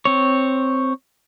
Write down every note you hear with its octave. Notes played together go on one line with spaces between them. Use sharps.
C4 C#5